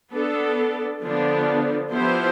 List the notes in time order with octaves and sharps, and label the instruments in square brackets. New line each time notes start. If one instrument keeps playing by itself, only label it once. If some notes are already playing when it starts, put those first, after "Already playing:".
[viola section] B3 D4 A4
D3 F3 B3 D4
F3 B3 E4 G4 C5